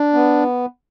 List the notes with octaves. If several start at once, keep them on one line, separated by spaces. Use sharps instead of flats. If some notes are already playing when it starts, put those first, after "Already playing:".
Already playing: D4
B3